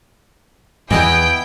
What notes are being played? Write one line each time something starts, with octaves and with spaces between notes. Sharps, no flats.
E2 E3 B3 E4 D#5 G5